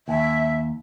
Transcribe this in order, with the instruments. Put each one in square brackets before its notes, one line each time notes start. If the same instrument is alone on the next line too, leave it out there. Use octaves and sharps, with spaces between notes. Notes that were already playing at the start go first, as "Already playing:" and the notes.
[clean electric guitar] D#2 [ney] E5